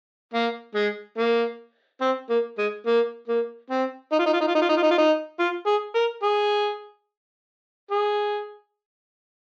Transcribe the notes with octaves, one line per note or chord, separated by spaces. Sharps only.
A#3
G#3
A#3
C4
A#3
G#3
A#3
A#3
C4
D#4
F4
D#4
F4
D#4
F4
D#4
F4
D#4
F4
D#4
F4
D#4
F4
G#4
A#4
G#4
G#4